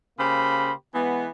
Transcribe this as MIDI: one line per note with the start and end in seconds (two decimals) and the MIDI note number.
0.19 0.72 49
0.19 0.72 58
0.19 0.72 67
0.19 0.72 72
0.19 0.72 83
0.94 1.29 52
0.94 1.29 56
0.94 1.29 59